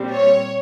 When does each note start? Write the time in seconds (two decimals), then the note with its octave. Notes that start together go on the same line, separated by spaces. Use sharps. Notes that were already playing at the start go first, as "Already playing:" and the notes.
Already playing: A#2 G3 C4
0.13 C#5